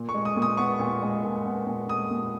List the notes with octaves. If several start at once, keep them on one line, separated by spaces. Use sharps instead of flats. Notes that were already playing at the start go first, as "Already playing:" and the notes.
Already playing: A#2
C#6
G#3
D#6
A#2
D#6
B3 C#6
A#2
G#3
A#2
B3
A#2
G#3 D#6
A#2